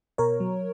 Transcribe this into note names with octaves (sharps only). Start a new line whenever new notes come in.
B2 A#4 C#5
F#3